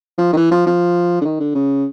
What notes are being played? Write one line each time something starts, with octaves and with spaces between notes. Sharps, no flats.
F3
D#3
E3
F3
F3
D3
D#3
D3
C#3